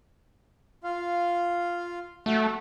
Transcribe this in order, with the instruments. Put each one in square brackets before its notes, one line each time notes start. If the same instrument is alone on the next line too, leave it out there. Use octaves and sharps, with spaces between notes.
[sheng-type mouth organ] F4 F5
[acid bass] A3 [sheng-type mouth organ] F#4